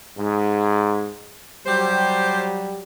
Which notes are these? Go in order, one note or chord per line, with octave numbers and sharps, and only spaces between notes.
G#2
F#3 G3 G4 C5